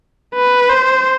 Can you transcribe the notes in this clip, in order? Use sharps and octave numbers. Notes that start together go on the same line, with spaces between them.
B4
C5